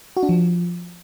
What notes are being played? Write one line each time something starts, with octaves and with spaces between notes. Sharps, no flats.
F#4
D4
F3